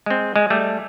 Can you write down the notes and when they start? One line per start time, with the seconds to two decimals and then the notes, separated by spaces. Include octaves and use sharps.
0.06 G#3 C4
0.36 G#3
0.50 G3 A3